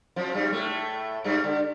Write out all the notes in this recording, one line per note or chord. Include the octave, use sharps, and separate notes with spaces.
F2 F3
G2 G3
A2 A3
G2 G3
D3